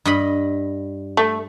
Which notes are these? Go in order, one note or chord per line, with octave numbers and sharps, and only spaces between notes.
G2 D#5 B5
A3